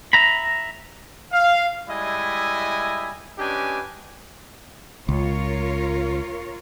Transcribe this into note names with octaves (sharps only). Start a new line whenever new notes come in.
E5 A#5 B5
F5
G3 G#3 E4 D#5 E5 G#5
C#4 D4 G4 B4 D#5 G#5
C#2 F4 A#4 C#5